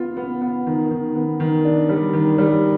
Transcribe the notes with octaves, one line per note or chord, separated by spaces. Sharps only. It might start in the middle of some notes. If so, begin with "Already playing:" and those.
Already playing: B3 F4
B3
B3
D#3
D#3
B3
D#3
D4
G3
D#3
G3